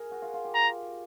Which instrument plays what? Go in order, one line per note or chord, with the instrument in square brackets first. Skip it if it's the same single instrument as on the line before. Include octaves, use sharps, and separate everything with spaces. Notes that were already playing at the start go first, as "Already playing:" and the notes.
Already playing: [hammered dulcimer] G#4 A#4
F#4
F4
F4
G4
[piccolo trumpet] A#5